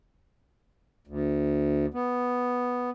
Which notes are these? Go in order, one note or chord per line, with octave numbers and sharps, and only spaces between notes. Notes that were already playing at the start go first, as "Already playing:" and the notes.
D2
B3